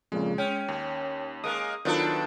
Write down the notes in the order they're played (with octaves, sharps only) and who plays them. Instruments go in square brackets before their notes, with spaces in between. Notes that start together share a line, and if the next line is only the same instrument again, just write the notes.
[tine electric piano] F2 A#2 C#3 [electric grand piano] G#3
[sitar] C#4 [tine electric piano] G5
[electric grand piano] D#2
[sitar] G#3 A#3 [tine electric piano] D#6
[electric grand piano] D#3 F#3 F4 [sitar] B3 D4 A4